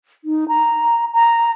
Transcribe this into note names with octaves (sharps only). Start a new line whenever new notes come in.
D#4
A#5
A#5